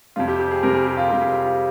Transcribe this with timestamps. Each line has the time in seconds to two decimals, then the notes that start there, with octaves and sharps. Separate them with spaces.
0.16 F2 C3 G3 F4
0.28 G4
0.39 G4
0.51 G#4
0.63 F2 C3 G3 A#4
0.74 G#4
0.86 G4
0.97 F4
1.09 F2 C3 G3 G4
1.22 G#4
1.33 G4
1.45 F4